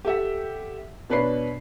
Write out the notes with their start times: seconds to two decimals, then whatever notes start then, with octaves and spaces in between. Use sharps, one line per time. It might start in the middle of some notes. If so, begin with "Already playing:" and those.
0.05 G4 A4 E5 F#5
1.10 B2 D4 B4 C#5 C7